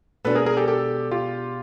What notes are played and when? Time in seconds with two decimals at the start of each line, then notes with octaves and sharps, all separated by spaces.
0.24 B2 G#3 B3 D4 F#4 A4 B4
0.35 G#4 A#4
0.46 G#4 A#4
0.57 G4 A4
0.68 G4 A4
1.11 F4 G4